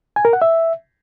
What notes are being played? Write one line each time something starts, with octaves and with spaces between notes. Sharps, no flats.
G#5
A#4
F#5
E5